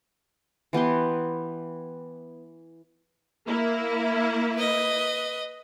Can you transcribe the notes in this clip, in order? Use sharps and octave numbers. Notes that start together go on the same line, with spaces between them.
E3 B3 G4 C6
A#3 E4
B4 D#5